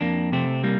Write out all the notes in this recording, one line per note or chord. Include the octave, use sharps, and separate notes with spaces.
F2 A#3 D4
C3 A3 C4
G3 A#3